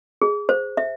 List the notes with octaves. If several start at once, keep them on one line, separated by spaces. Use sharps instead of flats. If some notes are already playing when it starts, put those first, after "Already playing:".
G#4
C5
E5